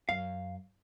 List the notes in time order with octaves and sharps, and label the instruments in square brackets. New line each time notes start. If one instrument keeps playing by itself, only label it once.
[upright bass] F#2 [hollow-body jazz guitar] F5